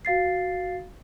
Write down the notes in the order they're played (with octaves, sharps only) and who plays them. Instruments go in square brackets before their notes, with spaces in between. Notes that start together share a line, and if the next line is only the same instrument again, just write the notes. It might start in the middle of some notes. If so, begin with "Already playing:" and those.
[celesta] F#4 F5 A6 C7